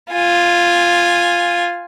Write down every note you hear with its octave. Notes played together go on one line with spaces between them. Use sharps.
F4 G#5